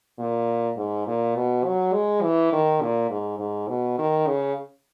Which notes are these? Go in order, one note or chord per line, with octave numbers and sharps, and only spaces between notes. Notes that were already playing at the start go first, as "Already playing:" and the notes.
A#2
G#2
A#2
B2
F#3
G#3
E3
D#3
A#2
G#2
G#2
B2
D#3
C#3